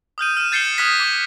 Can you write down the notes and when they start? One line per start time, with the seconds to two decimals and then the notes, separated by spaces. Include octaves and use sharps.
0.18 D#6 F6 G6 D#7
0.37 F6 D#7 E7
0.52 G6 A6 C7 C#7 E7 G7
0.78 D#6 F6 F#6 G#6 B6
1.00 D6